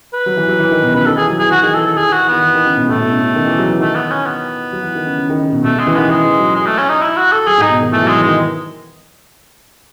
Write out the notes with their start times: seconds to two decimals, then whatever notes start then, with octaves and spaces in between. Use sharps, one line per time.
0.13 B4
0.26 F#3
0.37 E3
0.48 F#3
0.60 E3
0.71 D#3
0.82 B2
0.94 C#3 B4
1.06 D#3 A4
1.17 E3 G#4
1.29 F#3
1.39 E3 G#4
1.51 E3 F#4
1.62 D#3 G#4
1.74 E3 A4
1.86 A4
1.97 E3 G#4
2.09 D#3
2.12 F#4
2.20 E3
2.28 D#3 B3
2.43 E3
2.55 D#3
2.66 C#3
2.77 B2
2.88 A2 A3
3.00 B2
3.12 C#3
3.23 C#3
3.35 D#3
3.46 E3
3.58 F#3
3.69 E3
3.80 D#3 A3
3.96 B3
4.12 C#4
4.26 B3
4.72 F#3
4.83 E3
4.95 D#3
5.06 C#3
5.18 C#3
5.29 D#3
5.41 C#3
5.52 B2
5.64 B2 A3
5.75 C#3
5.79 G#3
5.87 E3
5.95 D#3 B3
6.10 E3 G#3
6.25 E3
6.40 F#3
6.56 G#3
6.66 A3
6.78 C#4
6.89 D#4
7.02 E4
7.17 F#4
7.32 A4
7.47 F#3 G#4
7.58 G#2
7.62 D#4
7.69 B2
7.81 D#3
7.92 E3 A3
8.04 F#3
8.08 G#3
8.16 E3
8.23 D#3 G#3